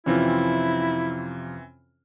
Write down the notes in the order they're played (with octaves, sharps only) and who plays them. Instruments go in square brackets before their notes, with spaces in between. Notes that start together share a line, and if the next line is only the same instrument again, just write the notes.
[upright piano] F2 C3 F4 [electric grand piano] E3 C4 C#4 [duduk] E4